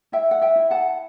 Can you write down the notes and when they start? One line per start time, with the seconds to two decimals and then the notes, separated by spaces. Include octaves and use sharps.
0.12 E4 E5 G5
0.31 F#5
0.42 E5 G5
0.56 E4
0.71 F#5 A5